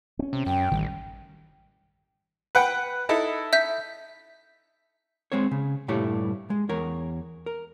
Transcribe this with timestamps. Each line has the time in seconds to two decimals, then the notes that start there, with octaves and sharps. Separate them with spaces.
0.19 C4 C#4
0.33 C3
0.46 F#2 G5
0.72 A1 D#3 G3
2.55 B4 F#5 G5
3.09 D#4 E4 A4
3.53 E5 G6 B6
5.32 G#3 C4 C5 C#5
5.51 C#3
5.88 G2 A#2 G3 A3 E4 C#5
6.50 G#3
6.69 E2 A#4 C#5
7.46 A#4